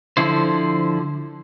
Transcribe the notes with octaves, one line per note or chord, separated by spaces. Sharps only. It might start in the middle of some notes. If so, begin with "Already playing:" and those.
D3 F3 E4 C5